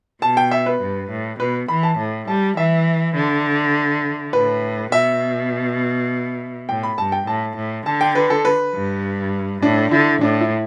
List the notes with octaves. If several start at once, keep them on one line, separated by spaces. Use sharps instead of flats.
B2 A5
G5
E5
B4
G2
A2
B2 B4
E3 B5
A5
A2
G3 A5
E3 E5
D3
A2 B4
B2 E5
A2 G5
B5
G2 A5
G5
A2 A5
A2
D3 A5
G5
B4
A4
B4
G2
A2 D4
D3 E4
A2 D4
E4